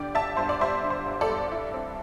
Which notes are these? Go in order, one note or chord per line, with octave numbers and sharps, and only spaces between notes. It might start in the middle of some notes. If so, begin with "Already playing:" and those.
Already playing: D3 G3 D5 G5
G1 E5 A5
G2 C5
D5
G3 C5 E5
D3
C5
G1
A4 D5
G2
E4
C4